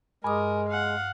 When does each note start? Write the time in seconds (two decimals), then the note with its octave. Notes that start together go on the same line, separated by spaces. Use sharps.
0.24 G2 G#3 A#4 G#5 D6 D#6
0.70 F5 F#5